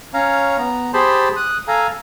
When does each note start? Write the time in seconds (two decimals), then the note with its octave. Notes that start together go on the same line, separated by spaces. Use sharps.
0.14 C#4 C#5 F5 A#5
0.58 B3 A#5
0.93 G4 G#4 C5 A5 B5 C6
1.36 D#6 F#6
1.68 A4 F5 G#5 A#5